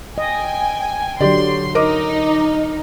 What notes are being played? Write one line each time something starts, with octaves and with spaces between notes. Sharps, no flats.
D#5 G5 G#5
D3 F#3 G4 D5 C6
D#4 A#4 D#5 D6